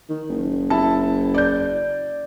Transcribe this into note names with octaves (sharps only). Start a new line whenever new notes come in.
D#3
F#1
E4 A5
D5 G6